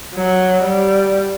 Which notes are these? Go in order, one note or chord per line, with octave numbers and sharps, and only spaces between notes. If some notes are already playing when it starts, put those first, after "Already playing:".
F#3
G3